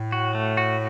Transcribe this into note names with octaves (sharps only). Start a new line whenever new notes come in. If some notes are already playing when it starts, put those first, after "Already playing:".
Already playing: A2
F#4
A3
F#4